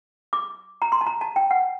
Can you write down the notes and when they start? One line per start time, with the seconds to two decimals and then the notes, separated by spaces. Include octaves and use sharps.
0.33 D6
0.82 A#5
0.92 C6
1.01 A5
1.06 A#5
1.21 A5
1.36 G5
1.51 F#5